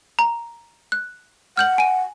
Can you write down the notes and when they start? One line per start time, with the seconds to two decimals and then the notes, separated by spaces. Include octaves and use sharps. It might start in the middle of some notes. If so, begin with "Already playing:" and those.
0.19 A#5
0.92 F#6
1.57 F#5 F6 G6 F#7
1.78 G#5 D#7